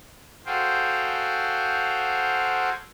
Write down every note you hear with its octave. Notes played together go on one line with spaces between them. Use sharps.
F#4 G#4 A4 C5 F5 G5